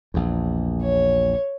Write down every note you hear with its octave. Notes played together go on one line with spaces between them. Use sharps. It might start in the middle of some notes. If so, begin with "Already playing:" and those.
A#1 E2
C#5